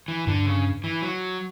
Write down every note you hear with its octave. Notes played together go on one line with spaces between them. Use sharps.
E3
G2 D3
C#3
E3
F#3